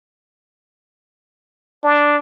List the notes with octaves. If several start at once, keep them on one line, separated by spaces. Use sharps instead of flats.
D4